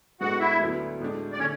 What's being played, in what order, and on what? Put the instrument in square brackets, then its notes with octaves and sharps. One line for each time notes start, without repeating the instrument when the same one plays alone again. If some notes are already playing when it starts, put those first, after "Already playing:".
[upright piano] A2 G#3 B3 D4 [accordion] F#4 F#5
[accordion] E4 E5
[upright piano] D2 D3 F#3 B3 E4
A2 G#3 D4
[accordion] D5
[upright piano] D3 A3 [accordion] C#4 C#5